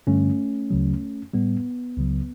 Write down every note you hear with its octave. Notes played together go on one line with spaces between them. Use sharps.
G2 D3 G3 A3 C#4
D2 C#3 F#3
A2 G3 B3
C#2 C#3 F#3